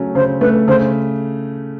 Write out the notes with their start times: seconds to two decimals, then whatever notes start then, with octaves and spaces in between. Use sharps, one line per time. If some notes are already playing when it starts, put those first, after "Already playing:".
Already playing: C#3 F#3 A3 C#4
0.15 C#3 C5
0.41 A3 B4
0.68 C#3 C5